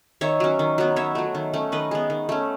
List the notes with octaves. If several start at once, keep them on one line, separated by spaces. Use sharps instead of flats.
D#3 C#5 E5
F#3 C#4
D#3
F#3 B3
D#3 C#5 E5
F#3 A3
D#3
A3 C#4
D#3 B4 D#5
G#3 B3
D#3
A3 C#4